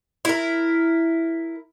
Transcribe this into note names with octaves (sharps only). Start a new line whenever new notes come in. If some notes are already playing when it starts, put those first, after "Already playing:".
E4 A#4